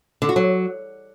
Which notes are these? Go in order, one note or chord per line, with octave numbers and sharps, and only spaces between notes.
D3
F#4
F#3